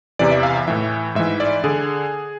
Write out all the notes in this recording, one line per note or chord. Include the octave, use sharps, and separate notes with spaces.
E2 C3 E3 D5
E5
F5
E5
A2 E3 E5
G#2 E3 E5
D5
D3 G#4